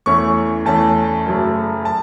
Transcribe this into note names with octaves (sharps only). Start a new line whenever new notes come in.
E2 E3 A3 C#4 C#6
E2 E3 A3 C#4 A5
F#1 F#2 F#3 A3
A5